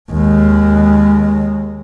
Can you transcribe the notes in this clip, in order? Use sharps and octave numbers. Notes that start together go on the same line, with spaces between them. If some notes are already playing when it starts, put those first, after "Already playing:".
D#2 G#3